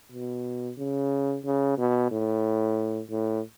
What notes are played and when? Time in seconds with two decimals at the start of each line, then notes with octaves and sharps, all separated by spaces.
0.12 B2
0.78 C#3
1.45 C#3
1.77 B2
2.11 A2
3.10 A2